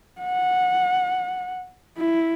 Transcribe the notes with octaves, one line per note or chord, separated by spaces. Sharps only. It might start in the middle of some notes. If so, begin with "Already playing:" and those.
F#5
E4